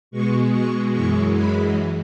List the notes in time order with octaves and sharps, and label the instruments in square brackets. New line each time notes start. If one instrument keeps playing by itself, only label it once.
[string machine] B2 G#3 C#6
C#6
F#2 E3 G#3 C#6
B5